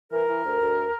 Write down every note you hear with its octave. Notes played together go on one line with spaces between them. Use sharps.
E3 A#4
E3
D2
D2